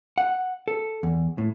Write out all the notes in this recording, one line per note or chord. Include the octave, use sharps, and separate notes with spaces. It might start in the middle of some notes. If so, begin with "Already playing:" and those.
F#5
A4
E2
A2